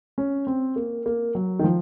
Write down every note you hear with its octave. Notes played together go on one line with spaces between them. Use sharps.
C#4
C4
A#3
A#3
F#3
D#3
F3